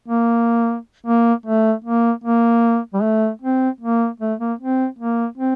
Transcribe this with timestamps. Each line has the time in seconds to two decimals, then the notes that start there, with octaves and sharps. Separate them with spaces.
0.08 A#3
1.06 A#3
1.46 A3
1.84 A#3
2.24 A#3
2.94 G3
3.02 A3
3.42 C4
3.81 A#3
4.20 A3
4.40 A#3
4.59 C4
4.99 A#3
5.37 C4